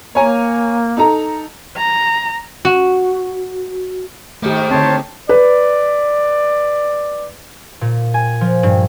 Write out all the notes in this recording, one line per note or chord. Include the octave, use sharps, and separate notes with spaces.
A#3 C#5 G#5 A#5
D#4 A4 A#5
A#5
F#4
G#2 D#3 A3 A#3 G4
D3 C4 C5 C#5 A5
B4 D5
A#2
G#5
F3
G2